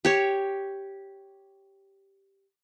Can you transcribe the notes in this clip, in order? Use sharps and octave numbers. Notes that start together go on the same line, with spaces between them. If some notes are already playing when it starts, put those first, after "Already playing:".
G4 C#5